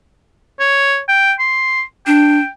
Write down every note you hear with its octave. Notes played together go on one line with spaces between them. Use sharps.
C#5
G5
C6
D4 G5